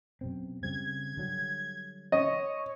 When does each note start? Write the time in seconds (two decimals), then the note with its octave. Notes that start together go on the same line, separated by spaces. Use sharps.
0.21 F#2 B2 C4
0.63 C#3 G3 C4 G#6
1.17 D3 F#3 G3
2.12 C#5 D#5